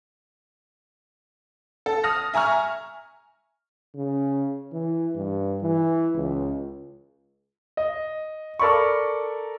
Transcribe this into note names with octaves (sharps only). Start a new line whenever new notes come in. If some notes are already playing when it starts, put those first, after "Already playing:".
A4
D#6 F6 A#6
E5 G#5 A#5 C#6 F6
C#3
E3
G2
E3
C#2
D#5
A4 A#4 D5 B5 C#6